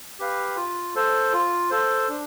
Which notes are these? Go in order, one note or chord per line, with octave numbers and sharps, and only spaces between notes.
G4 B4 F5
F4
A4 C5
F4
A4 C5
D4